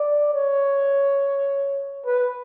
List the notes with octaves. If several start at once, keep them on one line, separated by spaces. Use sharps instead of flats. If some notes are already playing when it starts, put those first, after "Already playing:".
Already playing: D5
C#5
B4